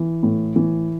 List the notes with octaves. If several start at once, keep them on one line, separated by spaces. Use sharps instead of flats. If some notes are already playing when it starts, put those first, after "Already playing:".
Already playing: E3
A2
E3